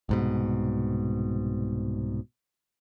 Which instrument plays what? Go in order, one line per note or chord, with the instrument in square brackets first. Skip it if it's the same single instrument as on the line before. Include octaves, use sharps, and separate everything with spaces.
[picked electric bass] C2 G#2 B2